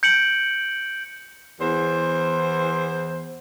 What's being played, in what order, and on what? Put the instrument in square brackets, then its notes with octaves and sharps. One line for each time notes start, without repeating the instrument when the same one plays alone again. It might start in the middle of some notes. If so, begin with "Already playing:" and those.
[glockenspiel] G6 C#7 D7 F#7
[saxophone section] E2 C5